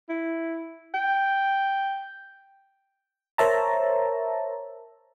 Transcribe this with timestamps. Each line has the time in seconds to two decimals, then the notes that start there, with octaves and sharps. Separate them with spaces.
0.09 E4
0.94 G5
3.38 A#4 C5 C#5 E5 A5 A#5